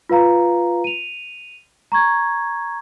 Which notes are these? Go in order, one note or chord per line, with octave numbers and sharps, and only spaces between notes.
F4 B4 F5 A#5
D#7 F7
A#5 C#6 G#6